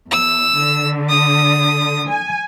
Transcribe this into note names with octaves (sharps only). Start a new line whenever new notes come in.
E2 E6
D3
D#6
G#5